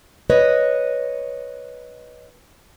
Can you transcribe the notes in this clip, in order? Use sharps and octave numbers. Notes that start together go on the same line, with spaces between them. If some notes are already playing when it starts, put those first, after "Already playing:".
B4 C#5 D#5